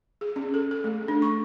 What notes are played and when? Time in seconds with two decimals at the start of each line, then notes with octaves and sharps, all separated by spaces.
0.21 G#4
0.36 C#4
0.54 A4
0.71 A4
0.84 A3
1.08 D4
1.22 C#6